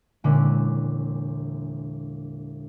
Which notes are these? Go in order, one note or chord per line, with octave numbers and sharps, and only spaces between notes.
E1 A#2 D3 C#4 D5